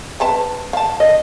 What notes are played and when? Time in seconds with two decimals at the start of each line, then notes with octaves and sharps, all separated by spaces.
0.20 C4 B4 A5
0.73 F5 A5
1.00 D#5